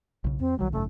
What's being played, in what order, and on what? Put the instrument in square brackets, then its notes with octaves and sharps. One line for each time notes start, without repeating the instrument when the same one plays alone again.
[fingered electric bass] B1 C#3
[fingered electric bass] F2 [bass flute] C4
[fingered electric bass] B1 D#3 G3 [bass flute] F#3
[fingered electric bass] G#1 F#2 C#3 [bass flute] A3